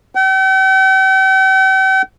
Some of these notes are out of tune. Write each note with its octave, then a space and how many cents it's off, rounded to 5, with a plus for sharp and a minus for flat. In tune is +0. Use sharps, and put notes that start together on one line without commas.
G5 -45